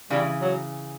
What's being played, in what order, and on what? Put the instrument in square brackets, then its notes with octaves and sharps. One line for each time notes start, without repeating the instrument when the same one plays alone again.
[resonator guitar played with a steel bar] C#3 E3 [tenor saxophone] G3
[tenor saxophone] F#3